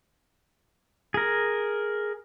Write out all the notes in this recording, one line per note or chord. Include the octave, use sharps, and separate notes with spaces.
G#4 A#4